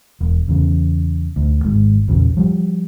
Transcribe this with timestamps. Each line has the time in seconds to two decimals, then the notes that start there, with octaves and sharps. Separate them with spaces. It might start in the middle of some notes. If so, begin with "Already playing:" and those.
0.21 E1
0.48 E2 C#3
1.36 D2
1.64 G#1 G#2
2.08 A#1 E2 C#3
2.37 F3 G3